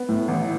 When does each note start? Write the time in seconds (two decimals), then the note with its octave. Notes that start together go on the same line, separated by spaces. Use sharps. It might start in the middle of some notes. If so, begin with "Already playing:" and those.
Already playing: B3
0.09 A2
0.28 A1